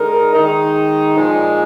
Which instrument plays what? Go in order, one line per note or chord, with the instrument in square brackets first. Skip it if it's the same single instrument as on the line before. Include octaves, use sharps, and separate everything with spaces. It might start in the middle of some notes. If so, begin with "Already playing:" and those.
Already playing: [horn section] D3 G#3 D#4 A#4
D#3 G#3 D#4
A#2 F3 G#3 D#4 G#4